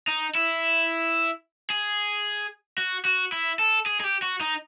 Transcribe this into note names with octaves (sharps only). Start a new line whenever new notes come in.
D#4
E4
G#4
F#4
F#4
E4
A4
G#4
G#4
G4
F#4
D#4